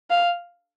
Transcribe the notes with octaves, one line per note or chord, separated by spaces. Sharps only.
F5